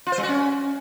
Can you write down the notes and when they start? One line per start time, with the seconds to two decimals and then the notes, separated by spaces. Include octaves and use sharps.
0.07 F4
0.12 C5
0.18 G3
0.23 F#4
0.29 C#4